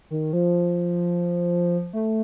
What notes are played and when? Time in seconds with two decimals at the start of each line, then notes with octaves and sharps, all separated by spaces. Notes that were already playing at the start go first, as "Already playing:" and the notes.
0.10 D#3
0.33 F3
1.93 A3